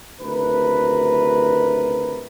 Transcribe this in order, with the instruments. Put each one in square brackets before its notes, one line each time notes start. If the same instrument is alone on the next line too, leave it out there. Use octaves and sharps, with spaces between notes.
[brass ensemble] F#1 D2 C3 A#4 B4